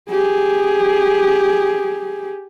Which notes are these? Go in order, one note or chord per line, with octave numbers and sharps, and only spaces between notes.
G4 G#4